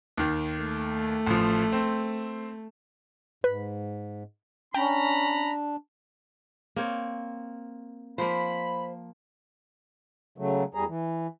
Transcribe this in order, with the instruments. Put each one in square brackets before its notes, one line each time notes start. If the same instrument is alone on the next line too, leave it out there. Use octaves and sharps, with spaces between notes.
[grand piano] D#2 D#3
[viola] A3
[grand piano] A1 F3
C4
[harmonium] G#2 [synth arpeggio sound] B4
[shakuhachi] C#4 [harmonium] D4 [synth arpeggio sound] G5 [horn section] A#5 B5
[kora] A#3 C4 C#5
[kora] F3 A#3 [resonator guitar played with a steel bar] C5 [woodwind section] B5
[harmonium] C#3 F#3 A3
E2 G3 G#4 A#5
E3